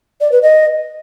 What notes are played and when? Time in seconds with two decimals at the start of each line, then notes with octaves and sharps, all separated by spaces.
0.21 D5
0.31 B4
0.42 D#5